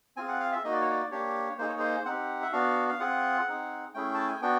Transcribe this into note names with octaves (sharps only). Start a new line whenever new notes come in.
C4 F4 G#4 G#5
F#5
F5
E5
A#3 D#4 F#4 D#5
D5
C#5
D5
A#3 D4 G4 C#5
A#3 D#4 G#4 C5
C#5
C5
C4 D#4 G4 F#5
E5
B3 D4 F#4 F5
F5
C4 F4 G#4 F#5
C4 D#4 G#4
A3 C#4 E4 G#4 G5
A5
G#5
B3 D4 F#4 G5